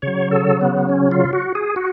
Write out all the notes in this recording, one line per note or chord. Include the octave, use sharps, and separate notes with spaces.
C#3 F#3 C#5
A4
B3
C#4
F4
F#4
G#4
F#4